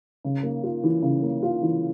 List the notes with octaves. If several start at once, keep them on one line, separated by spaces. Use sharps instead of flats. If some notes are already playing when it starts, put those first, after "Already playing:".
C#3
A#3
F4
E3
C#3
A#3
F4
E3